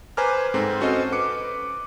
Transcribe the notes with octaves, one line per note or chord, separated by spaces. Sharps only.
B4 C5 G#5 A#5 D6 F6
G#2 C4 A4
C#4 F#4 A4 C5 D#5
B4 D6 C#7